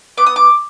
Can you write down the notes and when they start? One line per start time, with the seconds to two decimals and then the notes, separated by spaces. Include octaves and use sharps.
0.17 B3 D6
0.26 D#6
0.36 D6